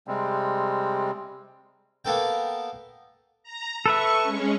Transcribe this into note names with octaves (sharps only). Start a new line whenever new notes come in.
C3 G3 G#3 C4
A#3 B3 A4 G5
A#5
A4 B4 E5 C#6
G#3 C#4